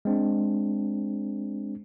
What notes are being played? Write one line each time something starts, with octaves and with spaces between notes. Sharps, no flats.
G#3 C4 D4